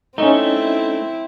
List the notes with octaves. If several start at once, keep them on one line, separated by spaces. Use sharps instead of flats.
A3 C4 C#4 D#4 E4